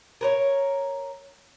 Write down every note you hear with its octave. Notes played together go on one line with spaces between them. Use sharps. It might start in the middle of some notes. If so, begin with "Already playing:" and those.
A#4 B4 C#5